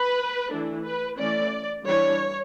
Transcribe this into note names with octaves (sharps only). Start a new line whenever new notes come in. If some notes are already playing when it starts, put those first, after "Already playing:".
Already playing: B4
E3 A3 D4
B4
E3 A3 C#4 D5
E3 G3 D4 C#5